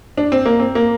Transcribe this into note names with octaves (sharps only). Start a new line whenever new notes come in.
D4
C4
A#3
C4
A#3